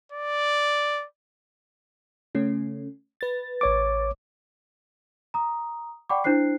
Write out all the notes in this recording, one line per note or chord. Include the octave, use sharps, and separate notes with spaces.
D5
C#3 A3 C#4
B4 A6
A1 C#5 D6
A#5 D#6
D5 F#5 G5 B5 C#6 D6
D4 E4 C5 F#6 C7